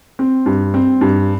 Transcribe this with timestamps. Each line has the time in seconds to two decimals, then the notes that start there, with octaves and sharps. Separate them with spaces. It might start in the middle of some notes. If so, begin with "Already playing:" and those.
0.19 C4
0.46 G2
0.74 C4
1.01 G2